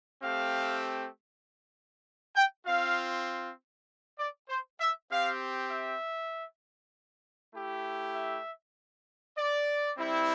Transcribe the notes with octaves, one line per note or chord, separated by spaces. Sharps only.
A3 C4 G4 F5
G5
C4 F4 F5
D5
C5
E5
C4 G4 F5
E5
A3 E4 G4
E5
D5
G3 C4 E4